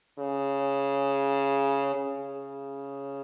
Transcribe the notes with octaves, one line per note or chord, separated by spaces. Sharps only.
C#3
C#3